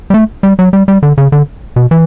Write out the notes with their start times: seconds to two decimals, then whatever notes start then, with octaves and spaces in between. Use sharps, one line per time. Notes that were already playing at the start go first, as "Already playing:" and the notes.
0.10 G3
0.14 A3
0.43 G3
0.59 F#3
0.73 G3
0.88 G3
1.03 D3
1.18 C#3
1.32 D3
1.76 B2
1.91 E3